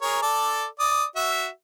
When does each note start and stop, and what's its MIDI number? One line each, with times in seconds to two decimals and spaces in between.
0.02 0.19 68
0.02 0.19 70
0.02 0.19 73
0.22 0.66 69
0.22 0.66 74
0.79 1.04 74
0.79 1.04 87
1.16 1.48 66
1.16 1.48 76